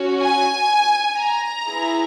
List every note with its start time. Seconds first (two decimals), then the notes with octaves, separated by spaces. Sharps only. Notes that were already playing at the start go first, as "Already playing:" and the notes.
Already playing: C#4 F#4
0.21 G#5
1.18 A#5
1.67 B3 E4 G#4